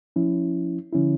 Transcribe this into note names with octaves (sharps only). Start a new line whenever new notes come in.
F3 C#4 E4
D3 F3 C#4 E4